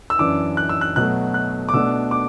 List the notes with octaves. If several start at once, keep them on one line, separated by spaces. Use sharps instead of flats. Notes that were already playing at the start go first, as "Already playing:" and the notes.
E6
F#2 E3 D4 D6
F#6
E6
F#6
B2 F#3 A3 F#6
F#6
D6
B2 A3 D4 E6
D6